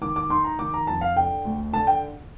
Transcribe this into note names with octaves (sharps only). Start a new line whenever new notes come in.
D#3 D6
D6
D#4 C6
A#5
D#3 D6
A#5
F2 A5
F5
D3 G5
D2
D3 A5
G5